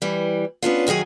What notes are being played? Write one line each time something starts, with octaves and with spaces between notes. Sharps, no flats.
E3 G3
B3 C#4 D4 F4
F#2 D#3 F#3 G#4 G#5